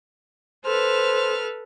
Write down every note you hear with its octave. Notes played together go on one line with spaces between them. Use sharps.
A4 B4 C5 F6